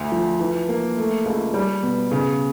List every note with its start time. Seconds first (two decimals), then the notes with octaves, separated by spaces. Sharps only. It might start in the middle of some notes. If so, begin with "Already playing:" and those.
Already playing: D2
0.12 F3
0.40 E3
0.69 A#3
0.97 A3
1.25 C#2
1.54 G3
1.83 B2
2.11 C#3